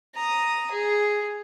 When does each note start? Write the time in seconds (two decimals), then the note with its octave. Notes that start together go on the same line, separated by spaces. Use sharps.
0.15 A#5 D#6
0.71 G#4